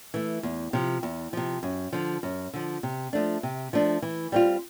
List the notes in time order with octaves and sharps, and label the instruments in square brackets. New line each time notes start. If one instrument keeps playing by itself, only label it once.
[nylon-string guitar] E3 A3
E2
C3 F3
E2
C3 F3
F#2
D3 F3
F#2
D3 F3
C3
F3 A3 D4
C3
F3 A3 D4
E3
G3 C4 F4